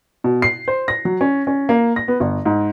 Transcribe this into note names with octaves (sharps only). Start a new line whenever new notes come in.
B2
C7
C5
A#6
F#3
C#4
C#4
A#3
A#6
B3
G1
G#2